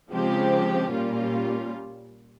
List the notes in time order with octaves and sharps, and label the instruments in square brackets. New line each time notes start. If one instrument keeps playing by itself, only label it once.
[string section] C#3 F3 G#3 C4 G4
A#2 G3 A#3 C#4 F4